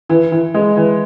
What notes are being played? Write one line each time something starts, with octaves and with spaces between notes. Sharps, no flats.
E3
E3
G#3
E3